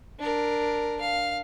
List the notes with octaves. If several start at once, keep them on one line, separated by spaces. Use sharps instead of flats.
D4 A#4
F5